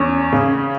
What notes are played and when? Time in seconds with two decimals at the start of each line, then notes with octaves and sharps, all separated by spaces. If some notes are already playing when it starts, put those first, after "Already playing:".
Already playing: E2 C#4
0.33 C#3